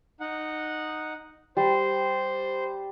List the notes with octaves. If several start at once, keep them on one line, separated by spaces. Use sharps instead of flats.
D#4 F#5
G3 C5